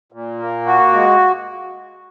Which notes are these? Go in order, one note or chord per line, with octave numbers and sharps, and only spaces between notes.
A#2
A#3
F#4
G#3